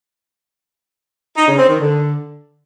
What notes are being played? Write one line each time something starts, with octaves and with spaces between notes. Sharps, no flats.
D#4
C#3
C4
D#3
D3